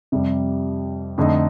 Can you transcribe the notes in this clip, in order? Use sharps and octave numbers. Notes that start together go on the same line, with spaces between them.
F2 C3 G3
F2 D3 A3 D#4